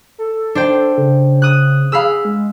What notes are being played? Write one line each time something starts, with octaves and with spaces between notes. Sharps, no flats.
A4
D4 C5 G5
C#3
D#6 F#6
G#4 F5 B5 E6
G#3